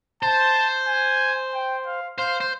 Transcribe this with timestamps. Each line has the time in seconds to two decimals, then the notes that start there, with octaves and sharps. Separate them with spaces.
0.23 C5 A5
0.88 G#5
1.54 G5
1.86 F5
2.18 C5 F5
2.41 C5